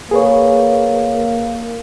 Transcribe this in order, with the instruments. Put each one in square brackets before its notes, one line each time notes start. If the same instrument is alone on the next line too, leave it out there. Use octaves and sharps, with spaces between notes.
[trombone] A#3 [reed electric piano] G#4 B4 C#5